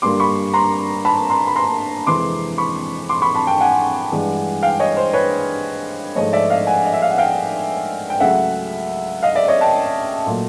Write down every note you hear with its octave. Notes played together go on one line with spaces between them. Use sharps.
G2 D3 G3 A#3 C6 D6
B5 C#6
A#5 C6
A5 B5
A#5 C6
B5
A#5 C6
F2 C3 E3 G#3 C6 D6
B5 C#6
C6 D6
B5 C#6
A5 B5
G5 A5
F#5 G#5
G2 E3 G#3
F5 G5
C#5 D#5
C5
B4 C#5
G#2 F3 A3 C#5 D#5
D5 E5
D#5 F5
F#5 G#5
D#5
E5
F5
F#5
F5 G5
G5
C#2 C#3 F#3 A3 E5 F#5
D#5 F5
D5 E5
C#5 D#5
G5 A5
A#2 F#3 A3